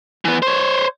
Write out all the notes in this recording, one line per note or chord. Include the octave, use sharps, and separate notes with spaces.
E3 B3
C5 C#5